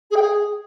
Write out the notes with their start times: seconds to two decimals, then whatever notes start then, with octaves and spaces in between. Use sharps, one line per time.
0.11 G#4
0.16 G5
0.21 G#4